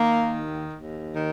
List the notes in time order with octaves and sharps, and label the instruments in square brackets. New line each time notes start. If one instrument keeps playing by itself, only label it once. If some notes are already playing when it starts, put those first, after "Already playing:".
Already playing: [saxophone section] D#3 A#3
D#2
D#2
D#3